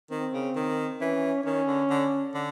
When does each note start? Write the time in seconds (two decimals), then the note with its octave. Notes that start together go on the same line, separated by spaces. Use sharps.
0.11 D#3 C4
0.33 C#3
0.55 D#3
1.00 E3 C#4
1.44 D#3 C#4
1.67 D3
1.90 D3
2.34 D3